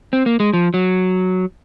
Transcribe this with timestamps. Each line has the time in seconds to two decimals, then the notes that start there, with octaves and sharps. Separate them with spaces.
0.13 C4
0.26 A#3
0.40 G#3
0.54 F3
0.74 F#3